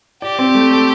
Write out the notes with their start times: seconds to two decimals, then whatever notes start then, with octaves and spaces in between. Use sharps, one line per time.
0.22 G4 D5
0.39 C4
0.55 A3
0.72 A4